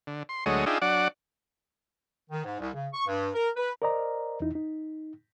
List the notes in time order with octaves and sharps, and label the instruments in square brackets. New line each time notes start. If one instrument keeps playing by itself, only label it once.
[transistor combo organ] D3
C6
D2 F#3 G#3 A3 C#5 D#5
D4 D#4 F4 G#4 E5 G5
F#3 D4 D5 F#5
[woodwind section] D#3
G#2
C2
C#3
C#6
G2
A#4
B4
[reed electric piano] A#4 C5 D5 D#5 A#5
E2 D#4 E4
D#4